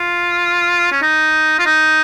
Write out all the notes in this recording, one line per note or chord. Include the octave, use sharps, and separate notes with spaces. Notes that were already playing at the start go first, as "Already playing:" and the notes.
Already playing: F4
C#4
D#4
F4
D#4